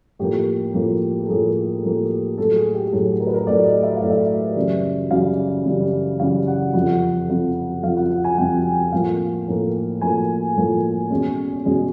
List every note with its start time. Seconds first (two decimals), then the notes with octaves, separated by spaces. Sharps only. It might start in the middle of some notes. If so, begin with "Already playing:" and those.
0.19 A2 F3 A#3 G4
0.74 A2 F3 A#3
1.23 A4
1.29 A2 F3 A#3 G#4
1.83 A2 F3 A#3
2.38 A2 F#3 A3 A4
2.56 G#4
2.74 G4
2.87 G4
2.93 A2 F#3 A3 G#4
3.20 A#4
3.27 B4
3.34 A#4
3.47 A2 F#3 A3 D5
3.65 D#5
3.83 E5
3.97 F5
4.02 A2 F#3 A3
4.10 E5
4.56 F#2 C#3 E3 G3
5.11 F#2 C#3 E3 G3 F5
5.65 F#2 C#3 E3 G3
6.20 F#2 C#3 E3 G3 F5
6.47 F#5
6.74 F2 C3 F3 F#5
7.29 F2 C3 F3
7.83 F2 C3 F3 F5
7.96 F#5
8.10 F#5
8.24 G#5
8.38 F2 C3 F3 G5
8.92 A2 F3 A#3 F5
9.47 A2 F3 A#3
10.01 A2 F3 A#3 G#5
10.56 A2 F3 A#3
11.10 E2 B2 G#3 C#4
11.65 E2 B2 G#3 C#4